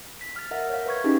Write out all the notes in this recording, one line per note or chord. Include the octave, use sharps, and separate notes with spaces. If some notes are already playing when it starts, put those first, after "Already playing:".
B6
F6 A6
A#4 E5 F#5
C#5 F5
B4 C#5 C#6 G#6
C#4 D#4 G4 G#4